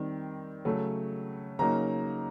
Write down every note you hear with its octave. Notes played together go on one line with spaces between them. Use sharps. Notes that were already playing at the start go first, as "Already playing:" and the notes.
Already playing: D#3 G3 C4
C#3 F#3 A3
C#3 F#3 A#3 D#4 A#5